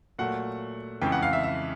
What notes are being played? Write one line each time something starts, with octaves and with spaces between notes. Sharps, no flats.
A#2 F#3 A3 F#5
F2 C#3 E3 G#3 G5
F#5
F5
E5
E5